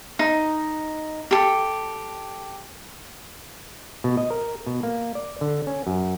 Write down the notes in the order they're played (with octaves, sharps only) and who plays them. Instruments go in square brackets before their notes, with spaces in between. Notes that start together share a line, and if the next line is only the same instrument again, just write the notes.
[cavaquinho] D#4
G4 A4
[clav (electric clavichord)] B2
D#5
A#4
B2
A#3
D5
D3
C#4
F#2